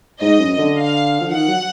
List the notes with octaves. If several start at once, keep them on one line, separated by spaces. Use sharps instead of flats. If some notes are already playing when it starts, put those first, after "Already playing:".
G#2 D#5
F#2
D3
F5
F3
D#3 F#5
F#3